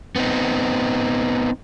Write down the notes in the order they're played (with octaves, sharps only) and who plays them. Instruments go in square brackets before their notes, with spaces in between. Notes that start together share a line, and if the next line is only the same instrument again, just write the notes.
[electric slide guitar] B3 C4 D#4